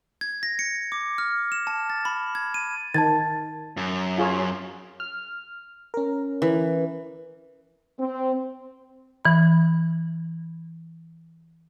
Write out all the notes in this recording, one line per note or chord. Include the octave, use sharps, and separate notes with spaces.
G#6
A#6
C#7
D6
F6
E7
A5
A6
B5
G#6
D#7
D#3 A5 G#6 A6
F#2
F4 G#4 C#5
F6
C#4 A#4
E3
C4
E3 B5